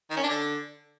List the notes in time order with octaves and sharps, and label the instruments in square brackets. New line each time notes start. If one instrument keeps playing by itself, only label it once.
[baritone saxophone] D#3
C#4
D4
D3